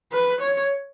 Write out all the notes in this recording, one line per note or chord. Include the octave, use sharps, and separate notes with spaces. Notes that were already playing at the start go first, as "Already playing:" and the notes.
B4
C#5